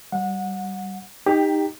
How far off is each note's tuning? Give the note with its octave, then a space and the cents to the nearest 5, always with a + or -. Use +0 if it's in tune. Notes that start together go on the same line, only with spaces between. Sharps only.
G3 -20 F#5 -25
D#4 +0 G4 +20 G5 +0